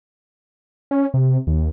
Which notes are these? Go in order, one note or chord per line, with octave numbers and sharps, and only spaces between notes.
C#4
C3
D#2